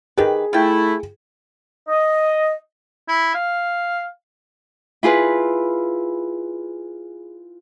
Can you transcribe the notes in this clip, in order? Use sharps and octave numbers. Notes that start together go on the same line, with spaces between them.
D#3 G4 G#4 B4
A3 E4 F4 G5
D#5
E4
F5
E4 F4 G#4 B4